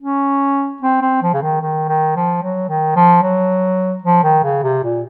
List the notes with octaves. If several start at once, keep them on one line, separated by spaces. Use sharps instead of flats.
C#4
C4
C4
F3
C#3
D#3
D#3
D#3
F3
F#3
D#3
F3
F#3
F3
D#3
C#3
C3
A#2